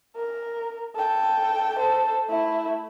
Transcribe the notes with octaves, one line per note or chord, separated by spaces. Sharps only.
A#4
A4 G5
A4 C5
A3 E4